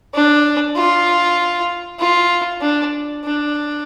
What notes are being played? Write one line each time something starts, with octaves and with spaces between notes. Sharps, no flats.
D4
F4
F4
D4
D4